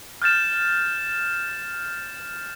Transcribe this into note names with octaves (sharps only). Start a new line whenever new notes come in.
F6 G6 A6 E7